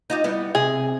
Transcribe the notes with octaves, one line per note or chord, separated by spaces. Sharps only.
D#4 F4 G4
G3 B3 E4
C3 G#4